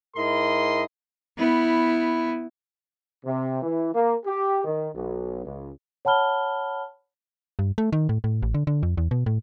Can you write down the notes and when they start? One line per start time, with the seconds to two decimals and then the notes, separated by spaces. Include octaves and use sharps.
0.16 G#2 E4 A#4 D#5 C6
1.38 B3 E4
3.26 C3
3.63 E3
3.94 A#3
4.26 G4
4.65 D#3
4.95 B1
5.45 C#2
6.05 C#5 F#5 A5 B5 F6 G7
7.59 G2
7.78 A3
7.92 D#3
8.09 A2
8.24 A2
8.42 A1
8.54 D3
8.67 D3
8.83 F2
8.97 E2
9.11 B2
9.26 A2